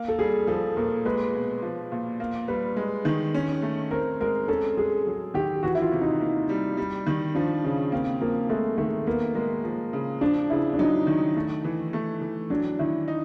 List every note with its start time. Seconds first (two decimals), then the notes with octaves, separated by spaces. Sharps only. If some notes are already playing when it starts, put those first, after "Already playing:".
Already playing: A#3
0.08 A4
0.19 G3 G#4
0.47 F3 A4
0.76 A#2 A#4
1.05 G#3 B4
1.34 B2
1.62 F3
1.92 A#2
2.20 A#3
2.48 G3 B4
2.76 G#3
3.05 D#3
3.34 C#4
3.62 A3
3.91 C4 A#4
4.20 G#3 A#4
4.48 C#4 A4
4.77 G#3 G#4
5.07 F#3
5.34 D#3 G4
5.63 E3 F#4
5.75 E4
5.82 F4
5.92 C3
6.02 D#4
6.20 A#3
6.49 G3
6.77 G3
7.06 D#3
7.35 F3 D4
7.64 C#3 C#4
7.92 A#3 C4
8.21 F3 A#3
8.49 G#3 A3
8.78 D#3 A3
9.07 A#3 B3
9.35 G#3 A#3
9.64 F3
9.93 C#3
10.21 F3 D4
10.50 C#3 E4
10.74 D4
10.79 F#3 D#4
11.07 D#3
11.36 A3
11.64 E3
11.93 A3
12.21 E3
12.50 F#3 D4
12.79 D#3 E4
13.08 D#4